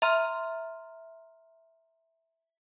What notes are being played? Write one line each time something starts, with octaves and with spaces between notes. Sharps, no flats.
E5 A#5 C6 F6